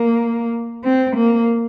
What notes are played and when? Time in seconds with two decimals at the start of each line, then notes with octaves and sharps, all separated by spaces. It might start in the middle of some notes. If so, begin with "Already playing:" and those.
Already playing: A#3
0.84 C4
1.17 A#3